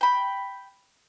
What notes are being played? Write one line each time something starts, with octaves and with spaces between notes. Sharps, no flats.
G5 B5